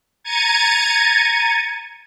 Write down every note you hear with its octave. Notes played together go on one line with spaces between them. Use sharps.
A#5 G#6 A6 C#7 D#7